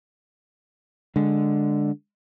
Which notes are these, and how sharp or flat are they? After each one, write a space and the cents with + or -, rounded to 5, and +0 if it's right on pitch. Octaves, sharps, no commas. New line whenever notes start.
D3 +0 G#3 -10